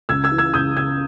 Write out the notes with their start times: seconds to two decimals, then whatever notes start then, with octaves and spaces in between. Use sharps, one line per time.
0.09 C#2 E6 G#6
0.24 E6 G#6
0.32 E3
0.38 E6 G#6
0.54 C#2 D#6 G6
0.77 C#3 E6 G#6